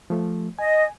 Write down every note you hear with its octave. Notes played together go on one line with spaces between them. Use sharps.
F3 A3
D#5 G#5